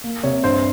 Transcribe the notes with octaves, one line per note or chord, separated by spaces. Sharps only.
A#3
C3 C#5
G2 C5